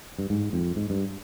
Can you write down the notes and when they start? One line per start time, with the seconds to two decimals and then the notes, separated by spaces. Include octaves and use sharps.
0.18 G2
0.30 G#2
0.53 F2
0.76 G#2
0.90 G2